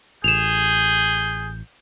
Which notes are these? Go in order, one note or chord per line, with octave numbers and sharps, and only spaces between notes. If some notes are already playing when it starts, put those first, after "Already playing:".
A1 G#4 G6 E7 F7